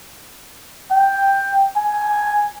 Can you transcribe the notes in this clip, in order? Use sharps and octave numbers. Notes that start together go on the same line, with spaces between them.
G5
G#5